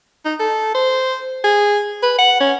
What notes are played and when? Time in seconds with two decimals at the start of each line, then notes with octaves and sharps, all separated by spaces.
0.25 D#4
0.40 A4
0.75 C5
1.44 G#4
2.03 B4
2.18 F#5
2.41 C#4